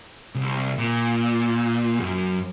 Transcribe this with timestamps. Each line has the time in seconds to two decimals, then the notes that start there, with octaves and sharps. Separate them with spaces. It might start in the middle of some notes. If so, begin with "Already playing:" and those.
0.35 C2
0.78 A#2
2.00 F#2 F#3